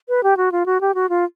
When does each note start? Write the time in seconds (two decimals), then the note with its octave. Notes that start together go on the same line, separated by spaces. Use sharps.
0.09 B4
0.23 G4
0.37 F#4
0.52 F4
0.66 F#4
0.81 G4
0.95 F#4
1.09 F4